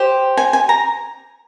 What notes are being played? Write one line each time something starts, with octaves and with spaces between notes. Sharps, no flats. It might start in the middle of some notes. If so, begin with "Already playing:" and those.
Already playing: G4 C5
G#5
G#5
A#5